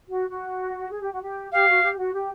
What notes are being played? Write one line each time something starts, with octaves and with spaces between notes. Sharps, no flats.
F#4
F#4
G#4
G4
F#4
G4
G4 F5
F#4
G4
F#4
G4